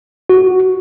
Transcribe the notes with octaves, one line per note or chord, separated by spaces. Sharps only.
F#4